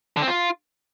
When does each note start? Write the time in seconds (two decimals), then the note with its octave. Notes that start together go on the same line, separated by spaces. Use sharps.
0.17 D3
0.22 C4
0.28 F4